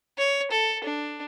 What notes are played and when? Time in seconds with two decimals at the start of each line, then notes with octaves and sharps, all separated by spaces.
0.18 C#5
0.51 A4
0.84 D4